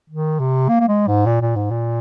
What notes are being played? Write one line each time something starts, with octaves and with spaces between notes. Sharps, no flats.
D#3
C3
A#3
A#3
G#3
G#2
A#2
A#2
G#2
A#2